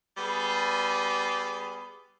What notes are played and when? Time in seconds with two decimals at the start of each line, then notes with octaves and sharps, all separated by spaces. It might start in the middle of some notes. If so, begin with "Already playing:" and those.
0.17 G3 B3 G#4